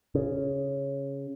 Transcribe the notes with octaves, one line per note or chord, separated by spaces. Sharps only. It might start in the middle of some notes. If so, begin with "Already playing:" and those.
C#3